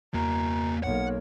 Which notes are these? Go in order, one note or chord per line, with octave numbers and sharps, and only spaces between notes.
E2 A#3 F#4 A#5
B1 A#3 C#5 F#5